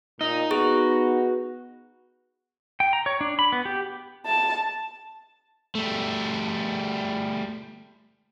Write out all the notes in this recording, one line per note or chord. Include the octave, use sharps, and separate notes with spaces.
A#2 D#4 D#5
B3 F#4 G#4
G5
A#5
C#5
D4
B5
B3
G4
A5
G3 A3